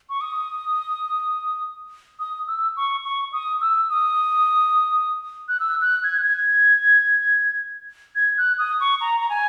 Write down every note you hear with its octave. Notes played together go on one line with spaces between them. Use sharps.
C#6
D#6
D#6
E6
C#6
C#6
D#6
E6
D#6
F#6
E6
F#6
G#6
F#6
G#6
G#6
F#6
D#6
C#6
A#5
A#5
G#5